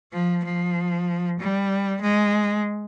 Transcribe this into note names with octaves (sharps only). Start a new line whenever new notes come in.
F3
F3
G3
G#3